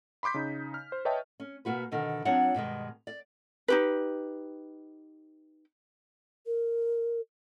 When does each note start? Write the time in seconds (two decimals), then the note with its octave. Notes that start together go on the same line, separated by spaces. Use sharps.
0.23 B5 C6 D6 G6 B6
0.34 C#3 D#4
0.74 F6
0.92 C5
1.05 B4 C#5 D#5 E5 G5 A5
1.40 C#4
1.65 B2 A#3 F#4 B4
1.91 B2 D3 D#3
2.25 F#3 C4 D4 F4 C#5 F#5
2.54 G2 B2 D#3 G#3
3.07 D5
3.68 D#4 G4 B4
6.46 A#4